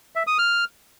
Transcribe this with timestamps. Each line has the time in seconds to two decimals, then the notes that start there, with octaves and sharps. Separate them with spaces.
0.16 E5
0.27 D#6
0.38 F6